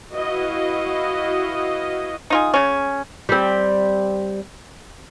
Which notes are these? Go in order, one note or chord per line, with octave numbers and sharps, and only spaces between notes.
E4 F#4 B4 D#5 F5
D#4 F4 G#4
C#3 C#4
G3 C4